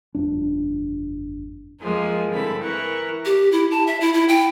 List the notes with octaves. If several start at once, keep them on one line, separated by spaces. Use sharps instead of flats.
G1 F2 D4
F2 F3 G#3 A#3 G#5
G2 D3 C4 E4 A4 B5
E3 E4 A#4 C#6 F#6
G4
E4
A5
E5
E4
E4
G5